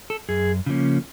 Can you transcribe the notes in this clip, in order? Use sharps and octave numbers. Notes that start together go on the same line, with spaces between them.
A4
F#2 G#4
C#3 F3 A#3 C#4